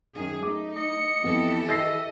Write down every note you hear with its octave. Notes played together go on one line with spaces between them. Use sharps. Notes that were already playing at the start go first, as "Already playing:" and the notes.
F#2 D#3 G#4
A3 D#4 D6
D#5 C#7
F2 E3 B3 G4 A4
D#5 E5 A6 A#6 C7